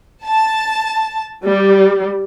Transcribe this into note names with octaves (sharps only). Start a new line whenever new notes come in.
A5
G3